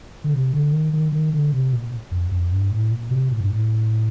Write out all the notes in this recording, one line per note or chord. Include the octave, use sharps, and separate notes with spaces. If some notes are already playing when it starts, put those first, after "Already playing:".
D3
C3
D3
D#3
D#3
D#3
D3
C3
A#2
F2
F2
G2
A2
A#2
C3
A2
G2
A2